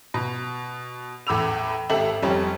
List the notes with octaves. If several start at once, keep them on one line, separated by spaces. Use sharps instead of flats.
B2
E2 A2 B5 D6 E6 F7
G#1 G4 A4 E5 F#7
F1 F2 G3 C#5